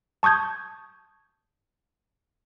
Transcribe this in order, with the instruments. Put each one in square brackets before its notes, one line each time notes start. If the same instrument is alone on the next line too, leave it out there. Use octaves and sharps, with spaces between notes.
[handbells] A5 C#6 D#6 G6 G#6